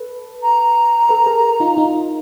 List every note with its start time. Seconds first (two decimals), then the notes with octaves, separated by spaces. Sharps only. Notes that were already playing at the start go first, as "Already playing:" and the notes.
Already playing: A4 B4
0.42 A#5
1.09 A4 B4
1.26 G#4 A#4
1.60 D#4 F4
1.77 D#4 F4